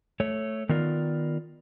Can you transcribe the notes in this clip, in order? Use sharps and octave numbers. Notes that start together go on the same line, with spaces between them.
A3 C#5
D#3 B3 F4 A#4 D5